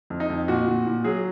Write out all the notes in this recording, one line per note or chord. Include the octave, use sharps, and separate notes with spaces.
F2
D#4
F2
A#2 F#4
A#2
A#2
F#3 G#4